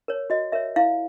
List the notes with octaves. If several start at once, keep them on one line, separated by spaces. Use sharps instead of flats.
A#4 C#5
F#4 D#5
A#4 C#5 E5
E4 F5